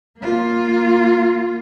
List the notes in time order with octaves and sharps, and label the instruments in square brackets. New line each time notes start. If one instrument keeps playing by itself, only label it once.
[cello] A#3 F4